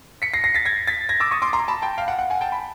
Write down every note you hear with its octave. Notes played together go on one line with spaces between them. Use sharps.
B6 C#7
A#6 C7
A#6 C7
A6 B6
G#6 A#6
A6 B6
G#6 A#6
D6 E6
C#6 D#6
C6 D6
A#5 C6
A5 B5
G5 A5
F5 G5
F#5
F#5
F#5 G#5
G5 A5
B5